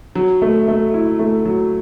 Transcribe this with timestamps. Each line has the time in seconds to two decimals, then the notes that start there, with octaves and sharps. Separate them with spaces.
0.15 F#3
0.42 A3
0.68 A3
0.94 E4
1.19 A3
1.45 F#3